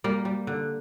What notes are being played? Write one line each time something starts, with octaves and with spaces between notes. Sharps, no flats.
G3 A#3
G3
D3